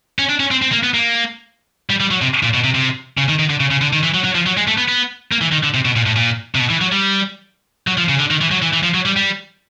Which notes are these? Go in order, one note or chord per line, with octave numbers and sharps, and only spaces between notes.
C#4
D4
C#4
C4
C4
A#3
B3
A#3
G3
G3
F#3
C3
A#2
B2
C3
C3
C#3
D#3
D#3
D3
C#3
C#3
D3
D#3
E3
F#3
F#3
F3
F#3
G#3
A3
B3
B3
A#3
E3
D#3
D3
C3
B2
A#2
A2
A#2
C3
B2
E3
F#3
G3
F#3
F3
C#3
D3
D#3
E3
F#3
E3
E3
F3
F#3
G3
G3